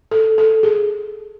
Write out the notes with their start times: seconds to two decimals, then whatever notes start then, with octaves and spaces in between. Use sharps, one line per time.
0.11 A4
0.38 A4
0.63 G#4